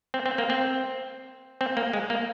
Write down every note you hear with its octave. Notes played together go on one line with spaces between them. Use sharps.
C4
C4
A#3
C4
C4
A#3
G#3
A#3